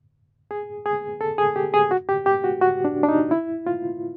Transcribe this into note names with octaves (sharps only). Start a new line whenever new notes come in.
G#4
G#4
A4
G#4
G4
G#4
F#4
G4
G4
F#4
F#4
D4
D4
D#4
E4
F4